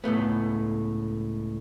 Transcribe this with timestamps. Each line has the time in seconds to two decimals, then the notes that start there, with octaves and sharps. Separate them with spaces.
0.04 C#2 A2 A3 B3